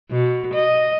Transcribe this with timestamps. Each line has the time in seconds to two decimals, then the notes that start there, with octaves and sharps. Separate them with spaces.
0.11 B2
0.54 D#5